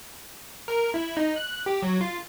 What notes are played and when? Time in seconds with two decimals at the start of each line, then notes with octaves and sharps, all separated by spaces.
0.68 A#4
0.94 E4
1.17 D#4
1.36 F#6
1.66 G4
1.82 F#3
2.01 F4